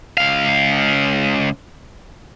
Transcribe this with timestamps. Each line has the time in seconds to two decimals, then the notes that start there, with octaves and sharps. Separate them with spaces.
0.17 C#2 F5